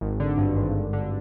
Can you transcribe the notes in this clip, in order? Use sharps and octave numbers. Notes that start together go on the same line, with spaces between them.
G#1
D3
G2
G#1
G#1
D3